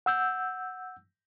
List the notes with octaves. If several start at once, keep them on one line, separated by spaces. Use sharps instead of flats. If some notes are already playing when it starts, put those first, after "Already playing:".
F#5 E6 G6